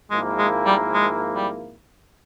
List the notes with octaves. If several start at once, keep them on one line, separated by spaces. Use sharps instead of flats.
G#1 G#2 F3 G#3 A#3 E4
G#3
G3
G#3
G3